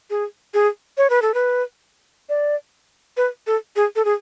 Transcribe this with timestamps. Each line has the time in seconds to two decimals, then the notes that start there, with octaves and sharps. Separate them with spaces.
0.10 G#4
0.54 G#4
0.98 C#5
1.10 B4
1.22 A4
1.34 B4
2.29 D5
3.17 B4
3.47 A4
3.76 G#4
3.96 A4
4.05 G#4